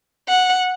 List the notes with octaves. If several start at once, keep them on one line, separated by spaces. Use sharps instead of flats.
F#5